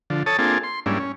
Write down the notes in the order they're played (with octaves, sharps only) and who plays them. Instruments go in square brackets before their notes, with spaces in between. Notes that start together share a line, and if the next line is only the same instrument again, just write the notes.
[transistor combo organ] D3 F3
A4 C#5 A5 D#6
A#3 C4 D4 F4 G#4 A4
C6
G#2 G3 A#3 C#4 D4 E4
C#4